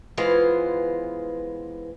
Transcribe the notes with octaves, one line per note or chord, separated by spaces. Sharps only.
E3 G#3 B3 F4 C5